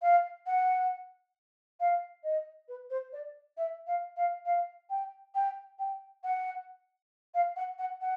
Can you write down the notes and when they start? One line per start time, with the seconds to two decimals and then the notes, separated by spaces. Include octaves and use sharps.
0.02 F5
0.47 F#5
1.80 F5
2.24 D#5
2.68 B4
2.90 C5
3.13 D5
3.57 E5
3.87 F5
4.17 F5
4.46 F5
4.90 G5
5.35 G5
5.79 G5
6.24 F#5
7.35 F5
7.56 F#5
7.79 F#5
8.01 F#5